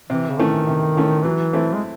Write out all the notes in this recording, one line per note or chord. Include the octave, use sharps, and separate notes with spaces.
C3 E3
C#3
D#3 E3 A3 C#4
C3
E3 A3 C#4
E3 F#3
A3 C4 E4
G#3